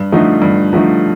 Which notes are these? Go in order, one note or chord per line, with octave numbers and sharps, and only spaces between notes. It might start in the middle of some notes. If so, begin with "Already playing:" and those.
Already playing: G2
D3 F3 A3 D#4
G2
D3 F3 A3 D#4